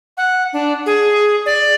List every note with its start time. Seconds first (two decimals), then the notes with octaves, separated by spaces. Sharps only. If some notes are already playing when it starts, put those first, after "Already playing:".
0.17 F#5
0.53 D4
0.86 G#4
1.46 D5